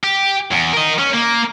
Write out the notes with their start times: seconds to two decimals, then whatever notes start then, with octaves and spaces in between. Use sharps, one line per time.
0.04 G4
0.51 E2
0.73 A#4 D#5
0.98 C#4
1.13 A#3